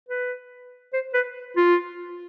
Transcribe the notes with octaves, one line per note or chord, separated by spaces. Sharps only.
B4
C5
B4
F4